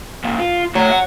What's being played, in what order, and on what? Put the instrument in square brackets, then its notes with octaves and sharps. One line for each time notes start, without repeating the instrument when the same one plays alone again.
[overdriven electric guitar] C#2 A#2
F4
[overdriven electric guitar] A2 [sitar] F#3
[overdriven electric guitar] F#5